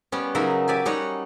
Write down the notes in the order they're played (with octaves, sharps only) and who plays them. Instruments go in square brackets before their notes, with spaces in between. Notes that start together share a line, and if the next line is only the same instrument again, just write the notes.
[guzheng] G3 B3 C#4
C#3 F#3 D#4 A#4 D#5 E5
G4 D5 E5 G#5
G3 C#4 D#4 C#5 D#5 F#5